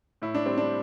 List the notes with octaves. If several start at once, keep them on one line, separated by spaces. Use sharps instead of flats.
A2 E4
D4
G3 C4
D4